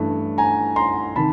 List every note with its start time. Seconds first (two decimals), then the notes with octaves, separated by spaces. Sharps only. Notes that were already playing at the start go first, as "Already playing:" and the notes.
Already playing: G2 E3 A3 C#4
0.38 G#5 A#5
0.76 A#5 C6
1.16 C3 D#3 A5 B5